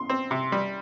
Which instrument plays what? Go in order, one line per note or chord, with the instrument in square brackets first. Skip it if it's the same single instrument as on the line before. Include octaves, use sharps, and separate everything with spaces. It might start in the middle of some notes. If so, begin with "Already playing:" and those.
Already playing: [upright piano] C6
[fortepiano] C4
C3
G3